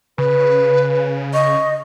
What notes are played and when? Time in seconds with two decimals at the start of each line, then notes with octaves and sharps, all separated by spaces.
0.18 C#3 B4
1.34 D#5 C#6